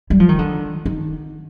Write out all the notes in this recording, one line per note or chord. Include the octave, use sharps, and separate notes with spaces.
G3
F3
D#3
D3
D#3